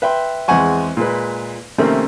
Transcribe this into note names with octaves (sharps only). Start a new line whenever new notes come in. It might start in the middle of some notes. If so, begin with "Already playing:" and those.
B4 E5 G5 C6
E2 G#3 C4 F#5 G#5 C#6
A#2 G#3 B4
C3 D#3 A3 A#3 C4 C#4